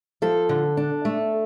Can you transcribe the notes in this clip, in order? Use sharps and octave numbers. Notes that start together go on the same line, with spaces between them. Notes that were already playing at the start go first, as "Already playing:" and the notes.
F3 A4
D3
D4
A3